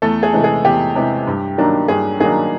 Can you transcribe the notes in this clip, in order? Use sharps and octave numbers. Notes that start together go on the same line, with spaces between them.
E2 A3 A4
G#4
C3 E3 G#3
G#4
E2 G4
C3 E3 G#3
G2
D#3 F#3 A#3 D4
G2 G#4
D#3 F#3 A#3 D4 G#4